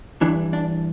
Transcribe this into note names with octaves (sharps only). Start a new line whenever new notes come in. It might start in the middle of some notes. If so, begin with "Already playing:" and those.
G2 E3 D4
D4